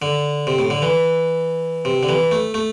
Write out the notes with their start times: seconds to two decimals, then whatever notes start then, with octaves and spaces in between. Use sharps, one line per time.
0.02 D3
0.47 C3
0.59 A2
0.70 D3
0.82 E3
1.85 C3
2.03 D3
2.09 E3
2.31 A3
2.54 A3